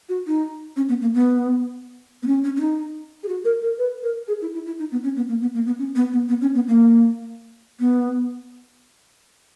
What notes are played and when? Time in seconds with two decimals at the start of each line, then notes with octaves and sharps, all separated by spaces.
0.09 F#4
0.27 D#4
0.76 C#4
0.89 B3
1.01 A#3
1.14 B3
2.23 B3
2.27 C#4
2.44 C#4
2.56 C#4
2.61 D#4
3.23 G#4
3.28 F#4
3.45 A#4
3.62 A#4
3.78 B4
4.03 A#4
4.28 G#4
4.42 E4
4.54 E4
4.66 E4
4.79 D#4
4.92 B3
5.04 C#4
5.16 B3
5.29 A#3
5.42 B3
5.54 A#3
5.66 B3
5.79 C#4
5.95 B3
6.13 B3
6.29 B3
6.42 C#4
6.55 B3
6.68 A#3
7.80 B3